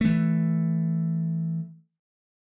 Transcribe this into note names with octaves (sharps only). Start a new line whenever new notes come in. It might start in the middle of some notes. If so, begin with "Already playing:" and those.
E3 A3